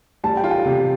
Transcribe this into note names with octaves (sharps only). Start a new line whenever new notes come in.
G3 A5
G5
F4
G5
C3